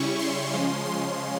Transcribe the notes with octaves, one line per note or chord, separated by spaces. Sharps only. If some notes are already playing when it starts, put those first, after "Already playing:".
Already playing: C#3 G3 C#4 E4 C#6
C6
C#3 F3 G#3 C#4
C6